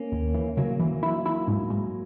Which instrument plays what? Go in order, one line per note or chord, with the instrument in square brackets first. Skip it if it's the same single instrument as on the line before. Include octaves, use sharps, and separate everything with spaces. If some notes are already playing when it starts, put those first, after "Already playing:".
Already playing: [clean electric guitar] A#3 C#4
[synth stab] D#2
E3
[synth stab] C#3 [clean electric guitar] F#3 A#3
[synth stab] E3
E4
E4
G#2
G#2